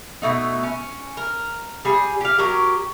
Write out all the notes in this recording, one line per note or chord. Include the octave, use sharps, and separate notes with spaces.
B2 A3 D#4
C#4
A#4
G3 G#4
G4 F5
F#3 G4 A#4